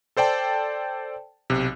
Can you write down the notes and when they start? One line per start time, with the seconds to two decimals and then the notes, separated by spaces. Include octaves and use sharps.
0.17 A4 C5 D5 G5 A5
1.50 B1 C3